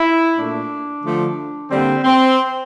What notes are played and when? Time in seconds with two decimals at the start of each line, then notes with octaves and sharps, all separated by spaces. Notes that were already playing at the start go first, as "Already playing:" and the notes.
Already playing: E4
0.36 A#2 A3 D4
1.03 D3 F3 A3
1.71 D3 G3 A#3 C4
2.04 C4